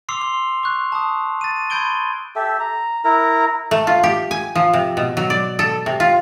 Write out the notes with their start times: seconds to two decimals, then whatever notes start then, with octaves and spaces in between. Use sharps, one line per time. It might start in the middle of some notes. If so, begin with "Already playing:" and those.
0.09 C6 D6 E6 C7 F7
0.21 C6
0.63 C#6 F#6
0.92 A5 D#6
1.41 A6 D#7
1.70 B5 C6 G6 G#6 D7 G7
2.36 G4 A4 E5
2.60 A#5
3.04 E4 A#4 A#5
3.71 A3
3.87 F4
4.03 G4
4.31 G#5
4.55 F3
4.73 C3
4.97 B2
5.17 F#3
5.30 D5
5.59 A4
5.86 C3
6.00 F4